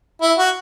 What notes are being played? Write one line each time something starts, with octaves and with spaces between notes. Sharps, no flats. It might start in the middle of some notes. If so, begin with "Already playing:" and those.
E4
F#4